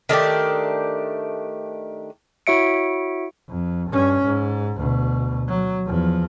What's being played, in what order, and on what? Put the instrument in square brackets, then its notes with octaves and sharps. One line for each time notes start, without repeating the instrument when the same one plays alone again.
[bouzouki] D#3 A3 D4 G4
[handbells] E4 F#4 C#5 E5 C#7 D7
[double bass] F2
G2 C#4
G#2
D2 B2
F#3
E2 F3